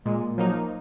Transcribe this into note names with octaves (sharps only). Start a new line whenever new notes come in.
A#2 G#3
F3 F#3 A#3 D#4